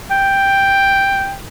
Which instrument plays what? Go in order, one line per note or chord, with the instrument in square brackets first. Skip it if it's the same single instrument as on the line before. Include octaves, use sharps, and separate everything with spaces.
[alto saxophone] G5